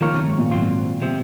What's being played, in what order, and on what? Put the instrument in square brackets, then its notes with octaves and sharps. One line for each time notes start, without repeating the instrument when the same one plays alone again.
[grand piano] D#3 [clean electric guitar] F3 A#3 F4 A#4 C#5
[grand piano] C3
G#2
A#2
[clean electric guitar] G#2 F#3 C4 F4
C3 F3 C4